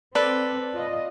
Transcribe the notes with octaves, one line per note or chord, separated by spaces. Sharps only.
C4 A4 B4 D5
F4 D#5